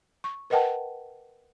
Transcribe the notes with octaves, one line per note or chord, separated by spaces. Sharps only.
C#6
A#4 B4 D#5 F#5 G5 A5